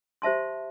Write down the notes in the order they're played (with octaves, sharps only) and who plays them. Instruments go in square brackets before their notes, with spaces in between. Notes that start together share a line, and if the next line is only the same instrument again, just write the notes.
[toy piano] G4 C5 E5 A5 C6